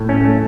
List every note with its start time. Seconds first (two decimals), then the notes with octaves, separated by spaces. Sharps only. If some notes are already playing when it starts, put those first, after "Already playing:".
Already playing: A2
0.09 A3 C#4
0.25 A3